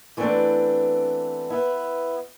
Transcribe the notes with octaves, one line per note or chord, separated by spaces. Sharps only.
E3 A3 B3 C4 D4
B3 E4